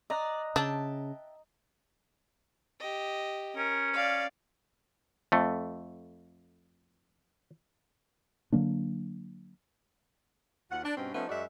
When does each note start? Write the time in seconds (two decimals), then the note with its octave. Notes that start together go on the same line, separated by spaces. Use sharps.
0.10 D5 D#5 A#5 F#6
0.56 C#3 D4 E5 G5 A5
2.80 G4 D#5
3.56 C#4 A#4
3.93 D5 F5
5.32 F2 A3
8.53 D3 F#3 A#3 D4
10.71 D#2 F4 F#5
10.84 D4
10.97 G2 B2 C4 C#4
11.15 F3 A3 B3 C#4 D#4
11.29 F#2 G#3 F#4 D5 E5